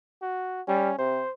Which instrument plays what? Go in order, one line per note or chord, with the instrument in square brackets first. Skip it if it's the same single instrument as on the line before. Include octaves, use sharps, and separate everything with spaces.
[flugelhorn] F#4
[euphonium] G3 [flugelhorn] C#4
[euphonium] C3 [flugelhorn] C5